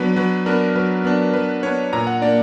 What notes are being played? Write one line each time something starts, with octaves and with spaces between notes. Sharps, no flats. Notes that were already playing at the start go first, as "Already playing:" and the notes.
Already playing: F#3 B3 D4 B4
F#3 B4
B3 D4 A#4
F#3 B4
B3 D4
F#3 B4
B3 D4 C#5
A#2 A#5
F#5
A#3 D4 D5